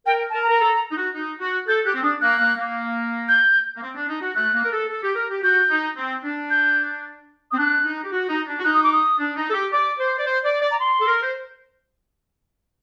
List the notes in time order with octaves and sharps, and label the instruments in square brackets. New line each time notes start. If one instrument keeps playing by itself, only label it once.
[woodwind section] A#4 [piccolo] G5
[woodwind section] A#4 [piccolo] A5
[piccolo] A#5
[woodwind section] A#4
A4
D#4
F#4
D#4
F#4
[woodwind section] A4 [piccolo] G6
[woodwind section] G4 [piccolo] F#6
[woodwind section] C4
[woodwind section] D4 [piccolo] D#6
[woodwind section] A#3 [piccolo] F#6
[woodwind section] A#3
A#3
[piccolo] G6
[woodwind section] A#3
C4
D4
D#4
F#4
[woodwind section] A3 [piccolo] F#6
[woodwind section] A#3
A#4
A4
A4
G4
A#4
G4
[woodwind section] F#4 [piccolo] G6
[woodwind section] D#4
C4
D4
[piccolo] G6
[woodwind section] C4 [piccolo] D#6
[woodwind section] D4 [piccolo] F#6
[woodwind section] D#4
G4
F#4
D#4
D4
F#4
[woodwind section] D#4 [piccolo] F#6
[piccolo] D#6
D6
D#6
[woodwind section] D4
D#4
A4
G4
[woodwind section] D5 [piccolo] D6
[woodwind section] C5
D5
C5
D5
D5
[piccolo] A#5
C6
[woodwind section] A4
A#4
C5